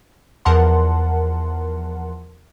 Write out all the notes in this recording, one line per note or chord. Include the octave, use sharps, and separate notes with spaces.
E2 F3 A#4 F#5 A5 C6